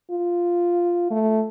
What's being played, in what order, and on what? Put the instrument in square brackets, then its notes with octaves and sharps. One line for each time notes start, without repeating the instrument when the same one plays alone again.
[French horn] F4
A3